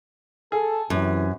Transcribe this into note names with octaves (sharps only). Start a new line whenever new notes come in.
G#4 A4
F#2 C3 E3